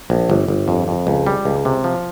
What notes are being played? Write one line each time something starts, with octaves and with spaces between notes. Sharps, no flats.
A#1
G1
G1
F2
F2
C#2
G3
C#2
C3
F3